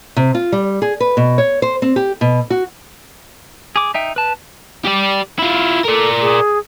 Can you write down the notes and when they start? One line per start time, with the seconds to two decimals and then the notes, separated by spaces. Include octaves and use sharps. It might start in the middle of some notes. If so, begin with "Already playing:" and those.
0.16 C3
0.35 F4
0.52 G3
0.82 G#4
1.00 B4
1.17 B2
1.38 C#5
1.62 C5
1.82 C4
1.96 G4
2.21 B2
2.50 F#4
3.76 G#4 D6
3.94 D#4 E5 G5
4.16 B4 A5
4.85 G4 D5
5.39 E4 F4
5.85 A4 A#4 D5
6.21 G#4